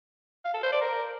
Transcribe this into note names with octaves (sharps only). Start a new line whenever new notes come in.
F5
A4
C5
D5
A#4